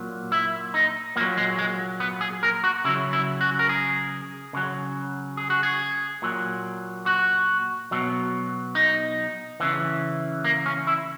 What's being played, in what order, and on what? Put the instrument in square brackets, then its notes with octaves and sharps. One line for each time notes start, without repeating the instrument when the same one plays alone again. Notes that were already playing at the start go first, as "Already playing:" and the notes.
Already playing: [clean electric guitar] A#2 F#3
E4
D#4
A#2 A#3
F#3
G#3
G#3
B3
G#4
A#4
F#4
C#3 F#3 E4
E4
F#4
A#4
G#4
C#3 F#3
G#4
F#4
G#4
A#2 F#3
F#4
B2 F#3
D#4
C#3 E3
A#3
C#4
E4